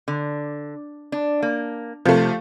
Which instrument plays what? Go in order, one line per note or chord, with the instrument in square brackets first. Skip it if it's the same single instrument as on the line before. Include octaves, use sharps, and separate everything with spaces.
[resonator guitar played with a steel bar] D3
D4
A#3
[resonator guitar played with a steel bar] C3 [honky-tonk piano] F3 A3